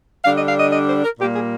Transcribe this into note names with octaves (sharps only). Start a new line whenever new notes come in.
D3 G3 D4 F5
D#5
F5
D#5
D#5
C5
A#4
A#2 G3 A#3 G4
G#4